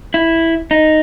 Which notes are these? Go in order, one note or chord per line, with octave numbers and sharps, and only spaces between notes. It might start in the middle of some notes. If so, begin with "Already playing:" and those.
E4
D#4